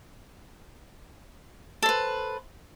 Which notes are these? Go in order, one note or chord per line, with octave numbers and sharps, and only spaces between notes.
A4 B4 C5